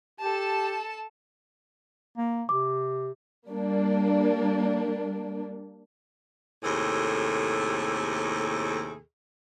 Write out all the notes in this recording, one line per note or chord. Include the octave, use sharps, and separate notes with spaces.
G4 A4 A5
A#3
C3 D6
G3 A#3 D4
D#2 A2 C3 G#4 A4